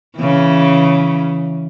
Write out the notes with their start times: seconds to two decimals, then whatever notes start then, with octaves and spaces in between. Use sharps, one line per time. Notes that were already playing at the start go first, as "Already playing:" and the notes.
0.19 C#3 E3